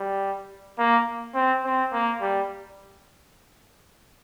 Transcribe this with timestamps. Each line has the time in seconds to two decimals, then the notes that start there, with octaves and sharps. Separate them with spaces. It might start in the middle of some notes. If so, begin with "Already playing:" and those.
Already playing: G3
0.78 A#3
1.35 C4
1.65 C4
1.92 A#3
2.21 G3